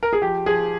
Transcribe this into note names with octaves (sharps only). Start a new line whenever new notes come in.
A#4
G#4
F3 G4
F3 G#4